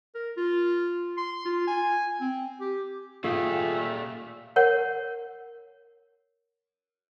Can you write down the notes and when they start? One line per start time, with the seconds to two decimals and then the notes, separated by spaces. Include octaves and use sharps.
0.15 A#4
0.37 F4
1.18 C6
1.45 F4
1.67 G#5
2.21 C4
2.60 G4
3.24 A#2 A3 F4 G4 G#4
4.56 A#4 C#5 F#5